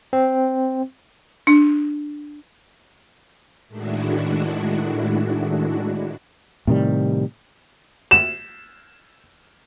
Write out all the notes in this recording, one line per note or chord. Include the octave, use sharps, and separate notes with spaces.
C4
D4
A2 D#3 G#3 D4 E4 F#4
A2 C3 D#3 G3
E7